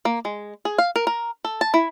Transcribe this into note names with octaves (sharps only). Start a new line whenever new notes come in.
A#3
G#3
G#4
F5
A#4
A#4
A4
A5
E4